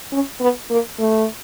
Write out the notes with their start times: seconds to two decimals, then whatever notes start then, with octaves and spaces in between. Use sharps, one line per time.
0.12 C#4
0.40 B3
0.70 A#3
0.99 A3